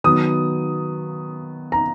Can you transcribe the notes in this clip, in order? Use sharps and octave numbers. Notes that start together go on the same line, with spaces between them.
D#3 F#3 B3 D#6
A#5